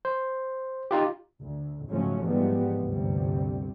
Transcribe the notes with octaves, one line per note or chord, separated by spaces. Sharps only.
C5
D#4 F4 G4
D2
G#2 C#3 F3 F#3 A3 C#4
G#2 E3 F3 G3 B3
G1 D2 C3 G3